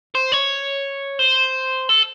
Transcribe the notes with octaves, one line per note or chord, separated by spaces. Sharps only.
C5
C#5
C5
A4